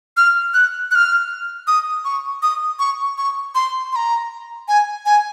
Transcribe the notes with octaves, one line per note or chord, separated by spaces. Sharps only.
F6
F#6
F#6
F6
D#6
C#6
D#6
C#6
C#6
C6
C6
A#5
G#5
G#5